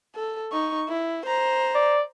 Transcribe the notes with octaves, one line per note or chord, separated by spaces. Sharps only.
A4
D#4 C#6
E4
C5 A#5
D5